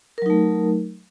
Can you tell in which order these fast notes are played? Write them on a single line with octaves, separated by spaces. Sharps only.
A#4 F#3 D#4 A3